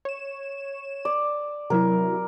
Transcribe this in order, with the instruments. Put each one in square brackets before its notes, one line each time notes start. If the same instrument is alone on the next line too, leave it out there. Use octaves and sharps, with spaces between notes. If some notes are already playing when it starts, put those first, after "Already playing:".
[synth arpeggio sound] C#5 E7
[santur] D5
[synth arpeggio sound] C3 F#3 E4 [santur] A#4